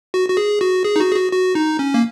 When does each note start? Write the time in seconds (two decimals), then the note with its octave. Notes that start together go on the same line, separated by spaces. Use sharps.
0.14 F#4
0.29 F#4
0.37 G#4
0.61 F#4
0.85 G#4
0.96 D#4
1.00 F#4
1.11 G#4
1.16 F#4
1.32 F#4
1.55 D#4
1.79 C#4
1.94 A#3